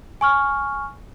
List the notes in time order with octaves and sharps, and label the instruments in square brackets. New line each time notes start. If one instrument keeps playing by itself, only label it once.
[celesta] G#5 C#6 F6